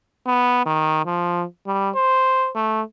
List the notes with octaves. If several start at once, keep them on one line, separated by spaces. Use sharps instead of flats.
B3
D#3
F3
G3
C5
A3